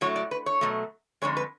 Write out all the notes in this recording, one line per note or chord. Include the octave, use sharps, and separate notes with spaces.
A2 F#3 A3 C#5
D5
B4
C#5
B2 F#3 A3
F2 D3 G#3 C#5
B4